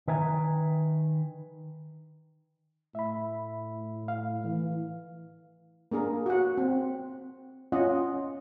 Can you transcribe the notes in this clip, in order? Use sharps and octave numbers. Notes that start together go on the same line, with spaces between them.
D#3 B4 E5 G5 G#5 A#5
A2 E5 B5
F5
E3
A#3 D4 G#4 A#4
F#4 F#5
C4
C#4 F4 D#5 F#5